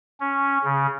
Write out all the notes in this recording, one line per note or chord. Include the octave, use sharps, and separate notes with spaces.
C#4
C#3